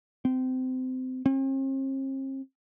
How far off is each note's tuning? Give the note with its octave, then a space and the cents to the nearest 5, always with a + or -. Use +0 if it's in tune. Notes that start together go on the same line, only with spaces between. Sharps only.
C4 -25
C4 +45